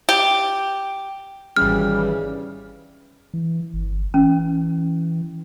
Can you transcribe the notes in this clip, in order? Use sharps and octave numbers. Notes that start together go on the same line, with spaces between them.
G4
G#1 C#3 E3 G3 F6
E3
G1
E3 C#4